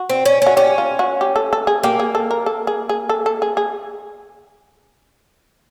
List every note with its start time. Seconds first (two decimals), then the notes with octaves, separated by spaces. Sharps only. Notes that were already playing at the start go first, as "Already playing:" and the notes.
Already playing: F#4
0.10 C4
0.26 C#4
0.42 C#4 F#4
0.57 C#4 G4
0.78 F4
0.99 F#4
1.21 G4
1.36 A4
1.53 A4
1.67 G#4
1.83 A#3 G4
2.00 G#4
2.15 A4
2.31 A#4
2.46 A4
2.67 G#4
2.89 G#4
3.09 A4
3.26 A4
3.42 G#4
3.57 G#4